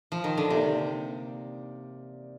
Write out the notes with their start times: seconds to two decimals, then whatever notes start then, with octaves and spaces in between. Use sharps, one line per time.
0.12 F3
0.24 D#3
0.37 D3
0.50 C3 A#3 D#4 G4 D5